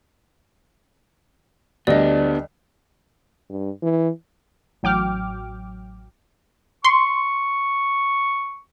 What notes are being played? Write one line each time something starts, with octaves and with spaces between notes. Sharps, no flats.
D2 G3 B3 D4 D5 D#5
G2
E3
A1 F#3 G5 D6 F6
C6 C#6